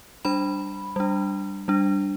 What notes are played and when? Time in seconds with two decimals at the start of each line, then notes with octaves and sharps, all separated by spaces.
0.25 G3 D4 B5
0.96 G3 D4
1.68 G3 D4